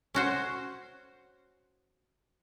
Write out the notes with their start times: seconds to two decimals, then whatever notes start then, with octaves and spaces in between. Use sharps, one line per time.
0.14 C#4 F#4 C5